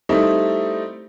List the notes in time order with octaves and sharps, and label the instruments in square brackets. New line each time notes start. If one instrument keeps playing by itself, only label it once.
[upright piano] G3 A3 C4 D#4 E4